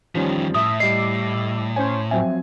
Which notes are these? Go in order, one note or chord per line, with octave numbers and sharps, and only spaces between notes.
E2 D#3 F3 G3 C#4
A2 E5 D#6
G3 D#5 D6 E6 C7
C#4 C5 C#5 G#5
F3 F#3 C4 E5 G#5